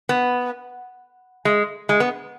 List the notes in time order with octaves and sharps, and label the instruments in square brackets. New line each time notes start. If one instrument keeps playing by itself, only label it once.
[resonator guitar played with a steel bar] B3
G#3
G#3
B3